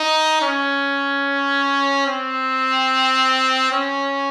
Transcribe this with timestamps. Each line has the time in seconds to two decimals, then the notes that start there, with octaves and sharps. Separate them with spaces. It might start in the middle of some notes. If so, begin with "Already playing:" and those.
Already playing: D#4
0.42 C#4
2.06 C4
3.72 C#4